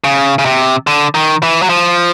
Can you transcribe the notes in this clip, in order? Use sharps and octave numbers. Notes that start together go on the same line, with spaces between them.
C#3
C#3
C3
D3
D#3
E3
F#3
F3